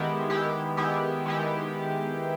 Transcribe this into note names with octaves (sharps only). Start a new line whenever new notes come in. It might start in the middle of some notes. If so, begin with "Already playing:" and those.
Already playing: D#3 G#3 B3 E4 G4
D#3 G#3 B3 E4 G4
D#3 G#3 B3 E4 G4
D#3 G#3 B3 E4 G4